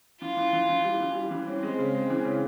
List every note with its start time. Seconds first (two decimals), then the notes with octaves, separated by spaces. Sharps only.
0.21 E3 F4
0.37 E3
0.53 E3
0.69 E3
0.84 G3
1.00 E3
1.15 G3
1.31 E3
1.47 C4 C#4
1.63 G#3
1.79 C#3
1.94 G#3
2.10 E3
2.25 C#3